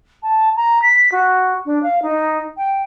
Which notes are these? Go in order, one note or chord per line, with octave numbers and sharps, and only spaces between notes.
A5
A#5
B6
F#4
D4
F5
D#4
G5